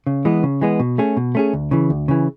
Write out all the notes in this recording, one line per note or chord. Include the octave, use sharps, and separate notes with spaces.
C#3
E3 G#3 B3
C#3
E3 G#3 B3
B2
A3 C#4 G#4
B2
A3 C#4 G#4
D2
C#3 E3
D2
C#3 E3